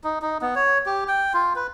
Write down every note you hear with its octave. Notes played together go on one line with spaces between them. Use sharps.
D#4
D#4
B3
C#5
G4
G5
F4
B4